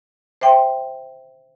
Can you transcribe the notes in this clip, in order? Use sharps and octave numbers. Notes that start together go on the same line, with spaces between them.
C5 E5 G5 C6